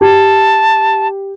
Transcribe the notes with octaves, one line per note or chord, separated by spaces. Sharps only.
G4 A5